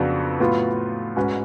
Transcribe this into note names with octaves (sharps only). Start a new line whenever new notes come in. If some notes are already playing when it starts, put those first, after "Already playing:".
Already playing: F2 C#3 F#3 B3 D4
A2 F#3 B3 F4
G#2 G#3 C#4 F#4 B4